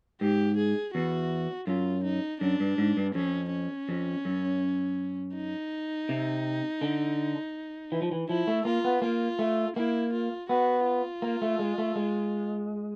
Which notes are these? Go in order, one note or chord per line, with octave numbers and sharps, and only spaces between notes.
G#2 G4
G#4
E2 F#4
F#2 F4
D#4
F#2 D4
G2
G#2
G2
F2 C#4
C#4
F2
F#2
D#4
C3
D3
E3
F3
E3
F3 E4
A3
A#3 F4
B3
A#3 F4
A3
A#3 E4
F4
B3 F#4
F4
A#3
A3
G#3
A3
G#3